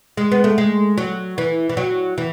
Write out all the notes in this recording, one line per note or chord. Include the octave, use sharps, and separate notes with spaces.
G#3
B3
A3
G#3
F#3
E3
E3
F#3
E3